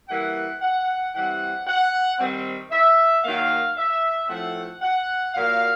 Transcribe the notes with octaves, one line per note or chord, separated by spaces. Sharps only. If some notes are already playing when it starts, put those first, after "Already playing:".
E3 G3 A#3 F#5
F#5
E3 G3 C4 F#5
F#5
D#3 G3 C4
E5
D#3 F#3 A#3 F5
E5
A2 F3 A3 C4 F#5
F#5
A#2 F#3 A#3 F5